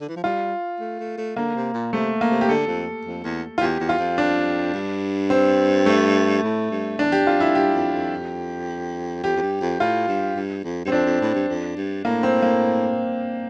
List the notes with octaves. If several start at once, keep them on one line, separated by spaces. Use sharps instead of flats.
D3
E3
F3
G3 F4
A3
A3
A3
D3 A#3
C3
A#2
C3 A3
A#3
C3
G4
D3 A4
F2
F2
E2
F4
E2 G4
E2
F4
F2
D4
G2
C4
A3
A2
G2
E2 D4
G4
F2 F4
E4
G2 G4
F2
F2
F2 G4
F2
G2
F2
A2 F4
G2
G2
F2
G2 C4
F2 D4
F2
A2
G2
F2
G2
A2 A#3
C4
A#3